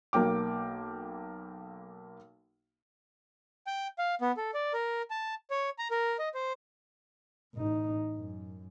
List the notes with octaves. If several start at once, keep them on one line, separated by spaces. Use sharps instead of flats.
B1 A#3 G5 D6
G5
F5
B3
A4
D5
A#4
A5
C#5
A#5
A#4
D#5
C5
A1 D#4
F#2